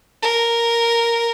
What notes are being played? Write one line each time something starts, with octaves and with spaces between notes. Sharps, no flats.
A#4